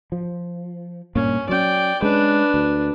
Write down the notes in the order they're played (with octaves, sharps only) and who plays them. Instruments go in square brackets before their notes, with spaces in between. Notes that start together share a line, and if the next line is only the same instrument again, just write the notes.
[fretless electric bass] F3
[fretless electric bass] G2 A#2 A#3 [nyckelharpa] C#4
[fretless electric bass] F#3 C#4 [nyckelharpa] D5 G5
[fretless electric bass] G#3 C#4 [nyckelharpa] D4 B4
[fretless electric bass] D2